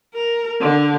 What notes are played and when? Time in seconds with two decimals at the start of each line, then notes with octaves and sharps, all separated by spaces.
0.14 A#4
0.61 D3